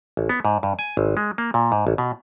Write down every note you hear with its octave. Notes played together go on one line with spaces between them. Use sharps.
A1
B3
G#2
G2
G#5
G#1
G#3
A#3
A#2
G#2
A1
B2